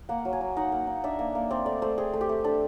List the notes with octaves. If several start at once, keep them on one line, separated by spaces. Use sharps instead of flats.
A#3 F#5
F#3
G#5
F#3
D#4 F#5
A#3
D#4
D4 E5
A#3
A#3
C4 D5
A3 D5
A3 C5
C4 G#4
A3
G4
A3
D4 A4